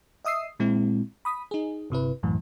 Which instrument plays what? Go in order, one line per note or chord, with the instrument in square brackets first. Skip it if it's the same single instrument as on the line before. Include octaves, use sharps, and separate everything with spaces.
[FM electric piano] D#5 E5 D#6 E6 C7
A#2 G#3 C4 E4
B5 D#6 B6
D#4 G#4
G1 C3 E4 B4
C2 F#2 A2 E3